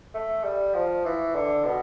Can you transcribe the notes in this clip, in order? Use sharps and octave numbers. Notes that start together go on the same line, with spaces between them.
A3
G3
F3
E3
D3
B2